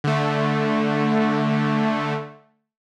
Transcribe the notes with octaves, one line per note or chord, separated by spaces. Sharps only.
D3 A3